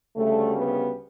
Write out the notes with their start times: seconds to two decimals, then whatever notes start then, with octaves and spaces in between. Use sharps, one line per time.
0.16 D2 C#3 G3 A3
0.55 B3